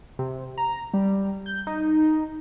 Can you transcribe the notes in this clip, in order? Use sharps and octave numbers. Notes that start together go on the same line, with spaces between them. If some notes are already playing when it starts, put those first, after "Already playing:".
C3
A#5
G3
G6
D#4